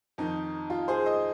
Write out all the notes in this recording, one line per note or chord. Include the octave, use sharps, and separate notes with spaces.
F2 D#3 D#4
F4
G#4 C5
D#5